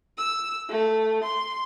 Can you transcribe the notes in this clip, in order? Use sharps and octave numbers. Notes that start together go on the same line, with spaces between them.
E6
A3
C6